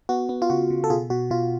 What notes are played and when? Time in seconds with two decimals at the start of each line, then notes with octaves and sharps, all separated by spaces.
0.09 B3 F#4
0.29 B3
0.42 F4
0.50 C#3 F#4
0.70 C#3
0.84 A4
0.90 B2 F4 G#4
1.10 B2 F#4
1.30 B2 F4